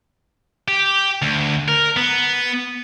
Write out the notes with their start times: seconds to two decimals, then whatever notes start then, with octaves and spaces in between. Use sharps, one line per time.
0.68 G4
1.22 D2
1.68 A#4
1.97 B3